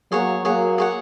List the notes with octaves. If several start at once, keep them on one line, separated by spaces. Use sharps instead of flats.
F#3 A#3 G#4 C#5 F#5
F#3 A#3 G#4 C#5 F#5
G#4 C#5 F#5